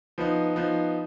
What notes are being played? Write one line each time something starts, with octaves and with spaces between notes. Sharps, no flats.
F3 B3 D#4
F3 B3 D#4